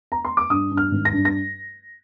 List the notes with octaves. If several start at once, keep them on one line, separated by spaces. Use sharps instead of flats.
A#5
C6
D6
G2 D#6
G2
F6
G#1
A#6
G2
A#6